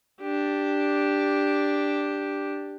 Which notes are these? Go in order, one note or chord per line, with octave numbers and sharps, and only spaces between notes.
D4 G4